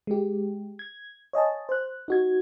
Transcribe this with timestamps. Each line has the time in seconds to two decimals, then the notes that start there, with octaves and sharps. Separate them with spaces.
0.07 G#3 G4
0.79 G#6
1.33 C#5 D#5 G#5 A5
1.69 C5 F#6
2.08 D#4 F#4 G#6